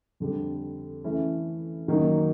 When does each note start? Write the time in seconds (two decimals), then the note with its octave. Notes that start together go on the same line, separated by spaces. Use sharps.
0.20 F2 D3 G3
1.04 E3 A3 C#4 E4
1.88 F#2 D#3 F#3 A#3 D#4